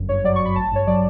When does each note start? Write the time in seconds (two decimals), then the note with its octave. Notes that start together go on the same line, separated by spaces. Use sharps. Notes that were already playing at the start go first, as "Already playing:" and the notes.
Already playing: G1 F#2
0.09 G2 C#5
0.24 F#3 D5
0.36 C#6
0.40 G1
0.45 B5
0.56 A1 A5
0.72 G2 C#5
0.87 F#3 D5